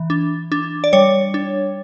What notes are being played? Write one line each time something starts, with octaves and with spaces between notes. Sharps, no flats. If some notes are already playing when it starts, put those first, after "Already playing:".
Already playing: E3
D4
D4
D5
G3 C#5
D4